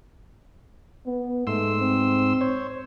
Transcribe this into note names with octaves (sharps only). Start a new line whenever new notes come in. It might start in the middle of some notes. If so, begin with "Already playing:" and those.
B3
G#2 A3 C6 E6
C4
C5 C#5